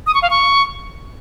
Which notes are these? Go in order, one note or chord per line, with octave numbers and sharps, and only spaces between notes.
D#6
C#6
F5
C#6